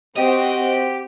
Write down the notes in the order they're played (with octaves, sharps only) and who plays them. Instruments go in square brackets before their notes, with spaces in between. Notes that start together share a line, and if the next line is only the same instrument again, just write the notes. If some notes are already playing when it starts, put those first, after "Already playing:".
[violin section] C4 F#4 [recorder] G4 [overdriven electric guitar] D#5